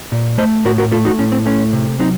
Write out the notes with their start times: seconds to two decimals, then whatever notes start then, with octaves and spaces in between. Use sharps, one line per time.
0.12 A#2
0.38 A3 C5 D#5
0.65 A2 F#4 A#4
0.78 F#4 A#4
0.92 A3 F4 A4
1.05 D#4 F#4
1.19 A2 C#4
1.32 C4
1.46 A3 C#4
1.73 C3
1.99 F#3 C4 D#4